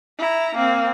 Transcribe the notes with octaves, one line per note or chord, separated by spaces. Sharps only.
E4 A#5
A#3 C4